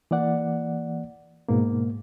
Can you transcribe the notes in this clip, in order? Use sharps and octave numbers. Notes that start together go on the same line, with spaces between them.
E3 A#3 D5 F#5
G#2 B2 A#3